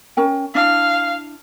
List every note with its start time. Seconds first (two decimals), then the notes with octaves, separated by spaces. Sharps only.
0.17 C#4 A#4 G5
0.55 D4 E4 F5